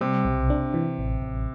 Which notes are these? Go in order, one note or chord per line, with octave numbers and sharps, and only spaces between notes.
C3 G3
B1
D4
E3
A1
A1